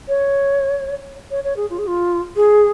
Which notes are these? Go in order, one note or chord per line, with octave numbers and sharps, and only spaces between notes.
C#5
C#5
C#5
G#4
F4
G#4
F4
G#4